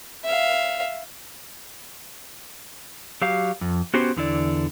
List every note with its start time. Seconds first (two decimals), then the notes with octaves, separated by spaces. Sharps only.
0.24 E5 F5
3.22 F#3 G4 F5
3.61 F2
3.94 B3 C#4 F#4 G4 C5
4.17 E2 D3 E4 D5